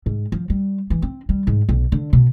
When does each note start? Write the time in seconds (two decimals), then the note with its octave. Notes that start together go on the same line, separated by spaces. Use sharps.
0.06 G#2
0.32 F3
0.50 G3
0.90 E3
1.02 C4
1.29 G3
1.47 G#2
1.69 B1
1.92 D3
2.13 B2